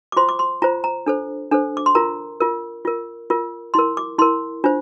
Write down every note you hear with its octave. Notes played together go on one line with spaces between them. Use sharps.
D6
F4 C5 C6
D6
C6
F4 C5 A#5
A#5
D4 A4 C5
D4 A4 C5
D6
C6
F4 A#4 A#5
F4 A#4
F4 A#4
F4 A#4
E4 A#4 C6
D6
E4 A#4 C6
D4 F4 C5